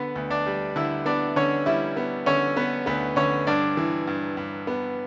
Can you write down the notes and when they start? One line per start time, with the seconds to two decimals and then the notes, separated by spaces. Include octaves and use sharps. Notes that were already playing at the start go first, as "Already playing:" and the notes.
Already playing: D3 B3 B4
0.15 D2
0.31 D4 D5
0.46 G3
0.76 D3 E4 E5
1.06 B3 D4 D5
1.36 D3 C#4 C#5
1.66 G3 E4 E5
1.97 B3
2.26 D3 C#4 C#5
2.56 B3 B4
2.86 D2 B3 B4
3.16 D3 C#4 C#5
3.47 G2 D4 D5
3.77 E3
4.07 G2
4.37 G2
4.67 B3